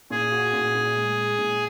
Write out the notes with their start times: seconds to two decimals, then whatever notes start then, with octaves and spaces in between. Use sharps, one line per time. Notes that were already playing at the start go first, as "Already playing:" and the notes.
0.10 A#2 G#4
0.32 F#4
0.53 A#2
0.75 A#2
0.96 G#3
1.18 G#3
1.39 A#2